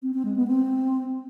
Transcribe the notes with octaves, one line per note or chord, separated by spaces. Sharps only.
C4
C4
G#3
B3
C4